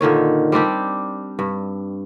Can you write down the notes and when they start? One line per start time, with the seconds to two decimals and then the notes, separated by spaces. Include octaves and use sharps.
0.01 A#2 D3 D#3 C#5
0.52 G3 C4 D4 G4
1.39 G2